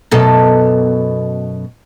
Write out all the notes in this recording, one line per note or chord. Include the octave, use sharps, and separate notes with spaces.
F#2 B2 A4